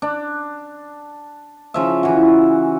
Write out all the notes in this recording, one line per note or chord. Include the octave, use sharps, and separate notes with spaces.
D4
C#3 F3 E5
E3 F#4